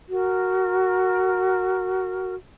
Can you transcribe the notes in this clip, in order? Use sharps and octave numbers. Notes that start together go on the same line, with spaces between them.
F#4 A#4